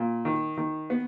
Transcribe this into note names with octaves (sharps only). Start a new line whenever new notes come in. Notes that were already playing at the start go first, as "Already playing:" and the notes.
Already playing: A#2
D#3
D#3
B3